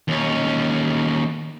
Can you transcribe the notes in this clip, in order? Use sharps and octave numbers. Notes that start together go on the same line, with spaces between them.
D#2 C#4